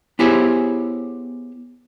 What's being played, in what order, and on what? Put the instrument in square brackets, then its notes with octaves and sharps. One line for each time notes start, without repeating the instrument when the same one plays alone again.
[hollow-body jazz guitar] B3 E4 G4 G#4 C5 C#5